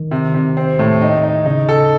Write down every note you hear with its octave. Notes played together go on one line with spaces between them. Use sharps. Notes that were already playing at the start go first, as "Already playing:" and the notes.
Already playing: D#3
C3
C3
C4
A2
D#4
D#4
C#3 D#4
A4